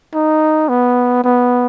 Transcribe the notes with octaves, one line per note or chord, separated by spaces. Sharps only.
D#4
B3
B3